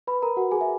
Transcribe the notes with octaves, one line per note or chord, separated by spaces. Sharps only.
B4 B5
A#4 A#5
F#4 F#5
G#4 G#5
E5